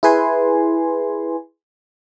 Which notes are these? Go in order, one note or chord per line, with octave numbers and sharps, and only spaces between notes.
E4 G#4 B4 G#5 C6